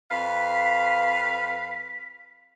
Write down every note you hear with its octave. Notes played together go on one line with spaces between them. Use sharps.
F2 B4 F5 B6